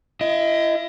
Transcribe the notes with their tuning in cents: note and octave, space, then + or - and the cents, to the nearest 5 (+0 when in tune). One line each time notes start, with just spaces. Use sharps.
E4 +40 D#5 +15